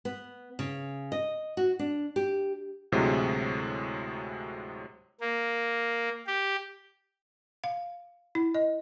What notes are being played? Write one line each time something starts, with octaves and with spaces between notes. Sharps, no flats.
B3
C#3
D#5
F#4
D4
G4
D2 A2 C3 F#3 G#3
A#3
G4
F5
E4
D#5